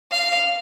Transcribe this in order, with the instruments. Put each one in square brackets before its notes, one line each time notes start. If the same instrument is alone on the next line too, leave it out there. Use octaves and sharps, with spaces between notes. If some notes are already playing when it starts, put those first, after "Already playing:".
[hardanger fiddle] F5